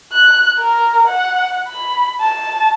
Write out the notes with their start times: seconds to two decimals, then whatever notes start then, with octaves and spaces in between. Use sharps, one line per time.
0.13 F#6
0.58 A#4
1.07 F#5
1.68 B5
2.20 A5